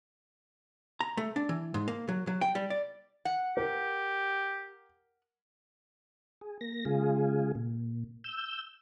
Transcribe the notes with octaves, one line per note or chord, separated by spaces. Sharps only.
A#5
A3
D4
E3
G#2
A#3
F#3
F#3
G5
G3
D5
F#5
G4 A#4
G#4
A#3 A#6
C#3 G#3 F4 G#4
A#2
E6 G6